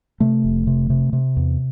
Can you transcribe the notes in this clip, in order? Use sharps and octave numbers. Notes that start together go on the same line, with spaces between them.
C3 A3
F1
C3
C3
C3
E2